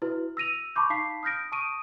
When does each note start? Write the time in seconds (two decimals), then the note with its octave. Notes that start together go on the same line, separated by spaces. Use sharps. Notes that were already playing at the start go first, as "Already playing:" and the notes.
0.02 E4 F#4 B4
0.37 E6 A#6 D#7 F7
0.76 A5 B5 C#6 D6 G6
0.90 D#4 F5 A5 B5 B6 C7
1.23 D#6 F6 G6 A#6 D7
1.52 A5 C#6 D#6 D7 D#7